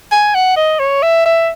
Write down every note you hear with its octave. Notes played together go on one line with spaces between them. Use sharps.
G#5
F#5
D#5
C#5
E5
E5